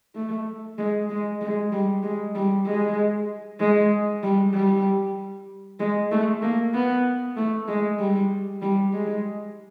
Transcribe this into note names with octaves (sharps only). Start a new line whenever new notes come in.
A3
G#3
G#3
G#3
G3
G#3
G3
G#3
G#3
G3
G3
G#3
A3
A#3
B3
A3
G#3
G3
G3
G#3